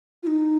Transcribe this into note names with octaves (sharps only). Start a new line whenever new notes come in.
F4
D#4